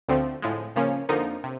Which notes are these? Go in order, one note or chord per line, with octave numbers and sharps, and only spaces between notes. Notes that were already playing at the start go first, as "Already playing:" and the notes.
D2 D3 F3 A3 C4
A2 F3 G#3
C#3 F3 A#3 C#4
F2 D3 F3 A#3 D#4
C3